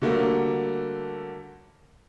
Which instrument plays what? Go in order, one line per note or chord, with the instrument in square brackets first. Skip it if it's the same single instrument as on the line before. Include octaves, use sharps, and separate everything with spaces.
[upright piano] D3 F#3 G3 A3 A#3